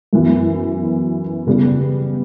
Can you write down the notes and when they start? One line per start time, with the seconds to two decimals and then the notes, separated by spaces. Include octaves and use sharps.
0.13 F#2 E3 B3
1.47 C#3 G3 B3